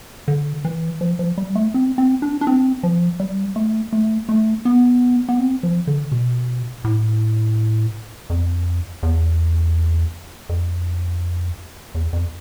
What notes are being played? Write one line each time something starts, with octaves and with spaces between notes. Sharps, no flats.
D3
E3
F3
F3
G3
A3
C4
C4
D4
D4
C4
F3
G3
A3
A3
A3
B3
B3
C4
F3
D3
B2
A2
F2
E2
F2
E2
F2